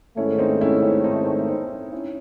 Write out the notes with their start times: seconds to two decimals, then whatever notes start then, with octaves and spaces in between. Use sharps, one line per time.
0.17 G#2 D#3 A3 C#4 E4
0.38 C4 D#4
0.61 C#4 E4
0.83 C#4 E4
1.04 C4 D#4
1.49 C4 D#4
1.92 C#4 E4